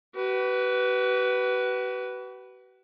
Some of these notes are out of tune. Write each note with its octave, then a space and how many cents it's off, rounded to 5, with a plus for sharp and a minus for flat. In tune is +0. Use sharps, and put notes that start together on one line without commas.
F#4 +45 B4 +0